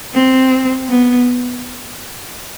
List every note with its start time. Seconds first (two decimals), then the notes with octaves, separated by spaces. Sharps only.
0.14 C4
0.89 B3